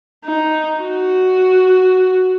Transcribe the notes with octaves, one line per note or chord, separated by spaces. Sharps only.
D#4
F#4